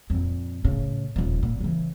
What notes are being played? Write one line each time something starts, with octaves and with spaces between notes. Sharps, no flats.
F2 A#2
A2 C#3
D#1 F3
A#2
C#3 E3